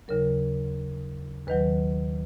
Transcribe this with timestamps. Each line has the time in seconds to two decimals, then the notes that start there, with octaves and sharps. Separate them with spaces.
0.08 D#2 C#3 F#3 A#4
1.48 D#2 D#3 F#3 B4